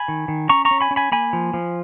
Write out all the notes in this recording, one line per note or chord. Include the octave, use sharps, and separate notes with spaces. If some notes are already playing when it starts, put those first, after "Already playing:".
Already playing: G#5 B5
D#3
D#3
C#4 A#5 C#6
A#5 C#6
C#4
G#5 B5
C#4
G#5 B5
A#3 G#5 B5
F3
F3